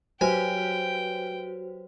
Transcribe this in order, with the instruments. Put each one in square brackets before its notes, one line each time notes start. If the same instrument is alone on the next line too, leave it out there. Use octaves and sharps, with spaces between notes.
[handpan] F#3 G4 [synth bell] F#4 B4 C5 [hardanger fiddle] G5 [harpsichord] G#5